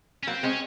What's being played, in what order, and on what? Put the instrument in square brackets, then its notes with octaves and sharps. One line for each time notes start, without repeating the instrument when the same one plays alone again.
[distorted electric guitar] C#4
[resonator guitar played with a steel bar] F#3 A#3 [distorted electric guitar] C4
[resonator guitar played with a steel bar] G#3 C4 [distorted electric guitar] C#4